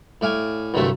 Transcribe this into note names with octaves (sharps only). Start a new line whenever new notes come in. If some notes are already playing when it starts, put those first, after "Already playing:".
A2 D5 F5 G#5
C2 G2 D3 F#3 A3